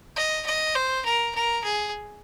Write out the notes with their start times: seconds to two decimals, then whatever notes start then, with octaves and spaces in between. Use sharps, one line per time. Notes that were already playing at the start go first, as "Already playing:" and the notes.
0.16 D#5
0.46 D#5
0.75 C5
1.05 A#4
1.35 A#4
1.64 G#4